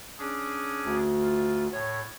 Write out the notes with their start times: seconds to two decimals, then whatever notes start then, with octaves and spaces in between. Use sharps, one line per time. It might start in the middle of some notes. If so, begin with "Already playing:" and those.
0.19 C#4 D4 G#4
0.85 D2
1.22 F4
1.73 A2 C#5